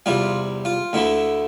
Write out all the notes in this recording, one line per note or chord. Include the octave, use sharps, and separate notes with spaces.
E2 C3 G3 F4
F4
D2 D3 A3 E4